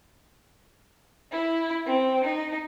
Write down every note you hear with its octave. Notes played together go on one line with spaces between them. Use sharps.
E4
C4
D#4